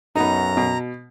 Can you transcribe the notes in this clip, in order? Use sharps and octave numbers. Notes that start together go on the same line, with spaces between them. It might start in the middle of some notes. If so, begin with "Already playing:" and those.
B1 F#2 B3 D#4 A#5
B2